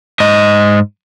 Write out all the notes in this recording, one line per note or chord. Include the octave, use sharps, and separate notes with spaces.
G#2 D#5